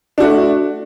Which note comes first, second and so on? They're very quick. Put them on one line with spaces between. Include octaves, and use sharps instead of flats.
D4 F#4 A3